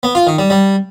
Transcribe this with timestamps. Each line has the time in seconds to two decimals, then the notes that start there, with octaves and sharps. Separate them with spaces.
0.03 B3
0.15 F4
0.27 D#3
0.39 G3
0.50 G3